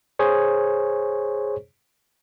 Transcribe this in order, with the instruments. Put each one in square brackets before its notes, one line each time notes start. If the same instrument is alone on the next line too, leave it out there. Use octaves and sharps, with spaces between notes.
[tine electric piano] G#4 C5 C#5